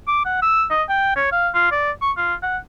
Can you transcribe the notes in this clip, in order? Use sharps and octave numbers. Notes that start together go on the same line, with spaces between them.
D6
F#5
E6
D#5
G5
C#5
F5
F4
D5
C#6
F4
F#5